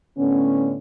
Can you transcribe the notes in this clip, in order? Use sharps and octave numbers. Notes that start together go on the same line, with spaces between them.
A2 D3 B3 C#4